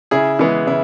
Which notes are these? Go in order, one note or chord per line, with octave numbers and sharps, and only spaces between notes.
C#3 E4 G#4
E3 G#3 B3 E4
C#3 E4